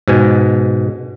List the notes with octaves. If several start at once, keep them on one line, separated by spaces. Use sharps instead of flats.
G#2 B2 G#5